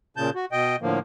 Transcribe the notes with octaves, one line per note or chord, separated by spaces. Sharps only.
A#2 C#3 A5 G6
F#4
B2 D#5 G5
A2 D3 F3 A#3